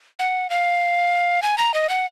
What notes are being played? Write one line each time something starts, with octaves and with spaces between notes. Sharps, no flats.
F#5
F5
G#5
A#5
D#5
F#5